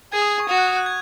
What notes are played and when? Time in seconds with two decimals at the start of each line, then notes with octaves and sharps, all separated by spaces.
0.12 G#4 G#6
0.22 D#6
0.40 C#6
0.49 F#4 D#6
0.58 F#6
0.68 D#6
0.77 F#6
0.86 G#6